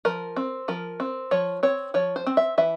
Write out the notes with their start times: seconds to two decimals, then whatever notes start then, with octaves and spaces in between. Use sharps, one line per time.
0.05 F3 A#4
0.36 C4
0.68 F3 A#4
1.00 C4
1.31 F3 C#5
1.63 C4 C#5
1.94 F3 C#5
2.16 C5
2.26 C4
2.37 E5
2.58 E3 E5